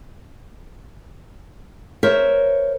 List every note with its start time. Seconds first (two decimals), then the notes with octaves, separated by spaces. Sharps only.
2.03 A#4 C5 C#5 E5